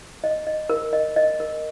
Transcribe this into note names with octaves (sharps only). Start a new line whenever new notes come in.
D#5
D#5
A#4
D#5
D#5
A#4